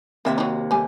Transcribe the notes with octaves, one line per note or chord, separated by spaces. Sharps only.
D#2 C3 C4 E5 G5
F#3 D#4
G3 A3 G4 G#5